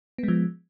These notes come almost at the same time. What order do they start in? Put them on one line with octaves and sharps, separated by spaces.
B3 G#3 F3